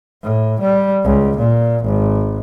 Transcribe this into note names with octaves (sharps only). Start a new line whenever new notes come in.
A2
G3
C#2
A#2
G#1